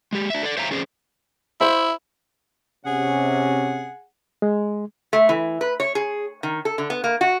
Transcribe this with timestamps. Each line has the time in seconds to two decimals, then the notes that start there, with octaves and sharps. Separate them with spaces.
0.13 G#3 G4
0.30 D4 E5
0.43 A4 C5 D5
0.57 C5 C#5 E5 F5 G5 A#5
0.71 C4 C#4 G#4 C5 D5
1.61 E4 C5 E5
2.85 C3 C#4 G#4 F#5
4.42 G#3
5.13 A3
5.29 E3
5.61 B4
5.80 C#5
5.95 G#4
6.43 D#3
6.65 A4
6.78 D3
6.90 B3
7.04 A#3
7.21 F#4